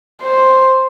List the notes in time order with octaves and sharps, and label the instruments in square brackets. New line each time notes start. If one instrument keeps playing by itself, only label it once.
[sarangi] C5